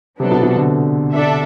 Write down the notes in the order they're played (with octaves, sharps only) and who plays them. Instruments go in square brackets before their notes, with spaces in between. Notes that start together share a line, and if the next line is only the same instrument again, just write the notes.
[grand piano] C3 [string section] F#3 B3 D4 A4
[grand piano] B2
B2
D3
[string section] D4 A4 E5